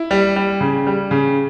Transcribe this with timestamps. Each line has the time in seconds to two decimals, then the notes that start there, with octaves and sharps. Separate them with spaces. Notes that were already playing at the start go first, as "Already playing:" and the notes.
Already playing: E4
0.11 G3
0.36 G3
0.60 C#3
0.87 G3
1.11 C#3